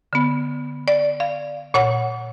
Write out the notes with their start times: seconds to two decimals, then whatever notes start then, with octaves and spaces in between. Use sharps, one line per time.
0.13 D3 B3
0.88 D5
1.20 F5
1.74 A#2 C#5 F#5